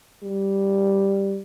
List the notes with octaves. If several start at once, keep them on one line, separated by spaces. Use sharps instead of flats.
G3